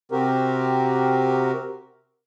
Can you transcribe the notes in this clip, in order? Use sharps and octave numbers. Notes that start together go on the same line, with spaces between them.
C3 C4 F#4 G4 A#4